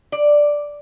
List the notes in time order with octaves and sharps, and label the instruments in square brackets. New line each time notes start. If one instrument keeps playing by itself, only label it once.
[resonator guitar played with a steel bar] D5